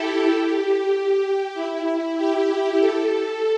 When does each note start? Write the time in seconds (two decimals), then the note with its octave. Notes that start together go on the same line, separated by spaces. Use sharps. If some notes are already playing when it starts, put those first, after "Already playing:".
Already playing: E4 G4 A4
0.27 G4
1.54 E4
2.17 G4
2.81 A4